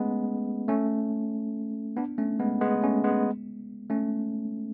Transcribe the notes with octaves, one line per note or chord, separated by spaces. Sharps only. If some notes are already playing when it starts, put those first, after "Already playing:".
Already playing: G#3 A3 B3 C#4
A3 C#4
B3 D4
A3 C#4
G#3 B3
G#3 B3
A3 C#4
G#3 B3
A3 C#4